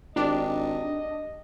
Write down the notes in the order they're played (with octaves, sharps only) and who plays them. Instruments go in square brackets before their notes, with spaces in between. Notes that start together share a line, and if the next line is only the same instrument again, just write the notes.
[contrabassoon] G#1 [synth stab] D4 [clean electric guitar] G4 [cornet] D#5